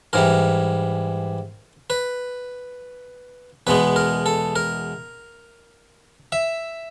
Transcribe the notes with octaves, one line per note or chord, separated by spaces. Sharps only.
G#2 E3 G3 A#4
B4
E2 B2 G#3 B3 B4
A#4
A4
A#4
E5